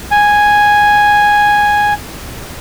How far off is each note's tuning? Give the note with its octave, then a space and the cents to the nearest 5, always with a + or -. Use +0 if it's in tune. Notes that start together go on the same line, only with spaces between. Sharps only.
G#5 -5